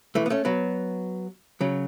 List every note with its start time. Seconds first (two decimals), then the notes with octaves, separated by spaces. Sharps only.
0.15 E3 A3
0.26 B3
0.30 A3 C#4
0.45 F#3 B3
1.61 C#3 F#3